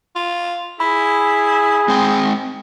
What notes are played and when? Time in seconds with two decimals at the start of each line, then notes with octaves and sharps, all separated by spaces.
0.15 F4
0.80 E4 G#4 B5
1.88 G#3 C4 G5